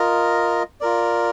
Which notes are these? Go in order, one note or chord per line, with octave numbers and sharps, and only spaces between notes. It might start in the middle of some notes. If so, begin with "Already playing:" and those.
Already playing: F4 A#4 D#5
F4 A#4 D5